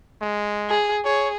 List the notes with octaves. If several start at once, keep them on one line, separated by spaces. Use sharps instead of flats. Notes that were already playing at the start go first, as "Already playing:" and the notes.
G#3
G#4
G#4 C#5